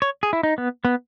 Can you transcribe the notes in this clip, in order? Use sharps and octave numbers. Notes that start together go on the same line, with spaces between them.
C#5
G#4
E4
D#4
B3
B3